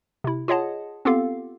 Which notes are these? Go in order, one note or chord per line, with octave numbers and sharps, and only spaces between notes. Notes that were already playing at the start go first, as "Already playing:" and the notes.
C3 E4
F4 G#4 C#5 D#5 F#5 A5
B3 C4 F4 G4 A4 F5